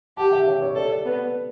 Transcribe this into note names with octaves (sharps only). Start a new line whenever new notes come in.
G4 F#5 A5
E5 G5
C#5 E5
C#5
A4 D5
D5
B3